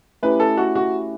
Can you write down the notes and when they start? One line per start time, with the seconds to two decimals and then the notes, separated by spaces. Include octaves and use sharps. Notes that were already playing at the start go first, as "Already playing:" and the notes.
0.23 A3 C#4 E4 G4 B4
0.40 A4
0.57 F#4
0.75 F#4